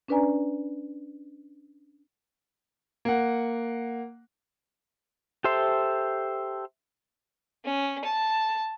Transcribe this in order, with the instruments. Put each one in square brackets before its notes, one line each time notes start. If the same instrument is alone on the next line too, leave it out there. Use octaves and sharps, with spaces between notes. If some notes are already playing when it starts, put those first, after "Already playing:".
[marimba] C#4 D4 B4 D5 G#5 A#5
[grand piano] A#3 F#5
[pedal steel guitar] G4 A4 C5 E5 C6
[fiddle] C#4
A5